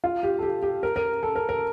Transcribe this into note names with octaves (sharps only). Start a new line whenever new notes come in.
F4
G4
A4
G4
G4
A#4
A#4
A4
A#4
A#4